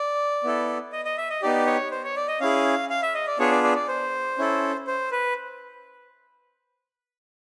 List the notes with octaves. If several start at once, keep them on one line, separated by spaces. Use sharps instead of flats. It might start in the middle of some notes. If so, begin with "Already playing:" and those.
Already playing: D5
B3 E4 A4
D#5
D#5
E5
D#5
B3 D#4 G4 D5
C#5
C5
C#5
D5
D#5
C#4 E4 G#4 F5
F5
E5
D#5
D5
B3 D4 F4 G#4 C#5
D5
D5
D5
C5
C#4 E4 A4
C5
B4